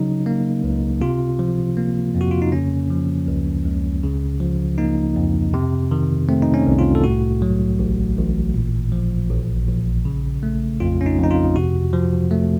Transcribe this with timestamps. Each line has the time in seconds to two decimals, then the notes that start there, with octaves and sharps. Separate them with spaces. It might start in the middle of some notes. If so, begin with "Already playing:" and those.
Already playing: C#3 F#3 D#4
0.26 A#3
0.64 C#2
1.01 C3 F4
1.39 F3
1.77 A#3
2.15 F2
2.21 F#4
2.31 F4
2.42 D#4
2.52 C#3 C#4
2.90 F3
3.28 C#2
3.65 C#2
4.03 C#3
4.40 F3
4.78 A#3 D#4
5.16 F2
5.54 C3
5.91 D#3
6.29 A3 C4
6.42 D#4
6.54 C#4
6.67 C2
6.79 F4
6.95 A4
7.03 A2 F#4
7.42 F#3
7.79 A1
8.17 A1
8.54 A#2
8.92 F3
9.30 A#1
9.68 A#1
10.05 C#3
10.43 A3
10.80 F2 F4
11.01 C#4
11.06 D#4
11.18 F2
11.24 D#4
11.31 F4
11.56 C3 F#4
11.93 F3
12.31 A3